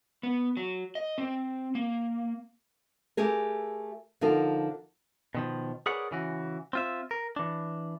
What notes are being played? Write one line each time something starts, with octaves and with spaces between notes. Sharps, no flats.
B3
F#3
D#5
C4
A#3
A3 G4 G#4 A#4
D3 F3 D#4 A#4
B2 D#3 F3
G#4 A#4 B4 C#5 D5 F#5
C#3 E3 F#4
C4 F4 E5
A#4
E3 D4